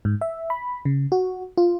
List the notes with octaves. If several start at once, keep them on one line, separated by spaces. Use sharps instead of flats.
G#2
E5
B5
C#3
F#4
F4